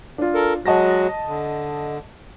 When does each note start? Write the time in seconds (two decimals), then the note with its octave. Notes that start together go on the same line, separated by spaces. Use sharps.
0.18 D4 F4
0.34 A4 A#4
0.66 F#3 G#3 F#4 D#5 A5 A#6
1.27 D3